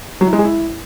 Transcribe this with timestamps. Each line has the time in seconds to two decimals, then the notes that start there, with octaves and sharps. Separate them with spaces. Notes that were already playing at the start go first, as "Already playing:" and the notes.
0.21 F#3
0.27 E4
0.33 G#3
0.39 G#4
0.45 E4